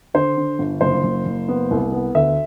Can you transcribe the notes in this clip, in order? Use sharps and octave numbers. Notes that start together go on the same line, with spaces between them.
D3 C5
D3
G1
F#1 C5
F#1
F#1
B3
C2
B3
D2 E5